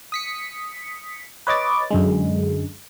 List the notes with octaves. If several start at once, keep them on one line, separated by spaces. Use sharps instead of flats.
D#6 B6 C#7
B4 C#5 D#5 D6 A6
F#2 D3 G#3